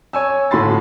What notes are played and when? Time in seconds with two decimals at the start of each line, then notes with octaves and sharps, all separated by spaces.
0.13 C#5 G#5 E6
0.51 G1 A2 F#4 B5 C6 A6